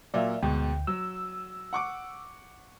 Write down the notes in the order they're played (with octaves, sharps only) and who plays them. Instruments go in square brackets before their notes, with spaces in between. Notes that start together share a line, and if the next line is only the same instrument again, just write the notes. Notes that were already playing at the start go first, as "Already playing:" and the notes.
[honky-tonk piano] A#2 F#3 [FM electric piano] D5 E5 F5
[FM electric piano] D2 G5 [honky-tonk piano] G#2 B2
[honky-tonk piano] F#3 [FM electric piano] E6
[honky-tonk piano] F#5 C#6 D6